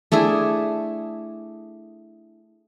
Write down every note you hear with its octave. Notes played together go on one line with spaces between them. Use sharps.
A3 D4 E4 G#4